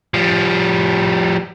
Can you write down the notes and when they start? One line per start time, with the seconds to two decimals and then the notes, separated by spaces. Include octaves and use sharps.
0.14 F3 G3